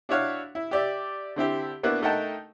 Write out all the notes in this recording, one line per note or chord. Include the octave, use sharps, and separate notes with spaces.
D4 E4 F#4 C#5 F5
E4
G4 D5 E5
D3 C4 E4 G4
A#3 B3 D4 E4 F#4
A3 D#4 A#4 F#5 G5 A5